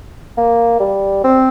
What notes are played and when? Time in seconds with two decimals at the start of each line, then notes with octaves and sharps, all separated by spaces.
0.37 A#3
0.80 G3
1.24 C4